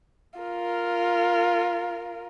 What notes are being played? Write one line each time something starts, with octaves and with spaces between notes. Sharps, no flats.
F4 A#4